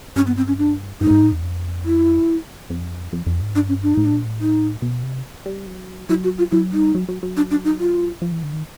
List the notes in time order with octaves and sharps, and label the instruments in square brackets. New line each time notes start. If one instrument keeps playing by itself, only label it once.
[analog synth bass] G2 [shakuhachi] C#4
[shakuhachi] B3
C4
C#4
D4
[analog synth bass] G2 [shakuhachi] D#4
[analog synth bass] A2
G#2
A2
E2
F2
[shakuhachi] E4
[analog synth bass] F2
F2
F2
G#2
[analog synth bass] G2 [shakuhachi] D4
[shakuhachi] C#4
D4
[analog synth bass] A2 [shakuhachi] D#4
[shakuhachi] D4
[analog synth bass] A#2
A2
[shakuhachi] D#4
[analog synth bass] B2
C3
G3
F#3
[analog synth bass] F#3 [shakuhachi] E4
[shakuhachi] F#4
F4
[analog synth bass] F#3 [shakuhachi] E4
[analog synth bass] G3 [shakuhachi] D#4
[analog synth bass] F#3
F#3
F#3
[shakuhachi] D4
D4
D#4
F4
[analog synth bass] F3
E3
D3
D#3